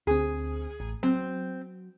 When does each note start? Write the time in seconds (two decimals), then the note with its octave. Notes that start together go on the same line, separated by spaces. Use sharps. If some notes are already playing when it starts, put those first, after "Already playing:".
0.07 D2 C4 G#4
0.80 A1
1.03 F#3 C4